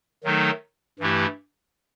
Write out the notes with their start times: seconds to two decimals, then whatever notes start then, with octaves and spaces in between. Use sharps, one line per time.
0.24 D#3 F#3 A3 D#4 A4
0.99 G2 E3 A3 E4 G4